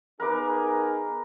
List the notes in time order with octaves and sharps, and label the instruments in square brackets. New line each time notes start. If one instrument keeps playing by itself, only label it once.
[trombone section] B3 D#4 G#4 [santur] A#4 B4 D6